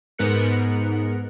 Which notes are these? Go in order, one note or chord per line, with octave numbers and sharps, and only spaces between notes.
G#2 B3 A#4 F#6 C#7